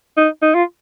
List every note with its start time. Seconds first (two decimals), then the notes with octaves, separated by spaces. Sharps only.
0.17 D#4
0.42 D#4
0.54 F4